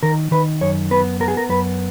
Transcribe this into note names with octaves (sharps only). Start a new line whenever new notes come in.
D#3 A#4
D#3 B4
F#2 C#5
B3 B4
B3 A#4
G#4
A#4
F#2 B4